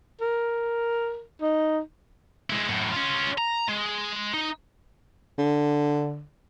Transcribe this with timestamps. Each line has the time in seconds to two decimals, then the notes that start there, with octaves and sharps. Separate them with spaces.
0.21 A#4
1.41 D#4
2.50 G#3 E4
2.69 F#2 A2
2.92 C#4 F4
3.38 A#5
3.68 G#3
4.34 D#4
5.38 D3